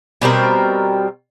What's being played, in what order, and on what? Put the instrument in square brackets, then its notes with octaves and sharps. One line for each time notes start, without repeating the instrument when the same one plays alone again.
[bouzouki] B2 G3 C4 A#4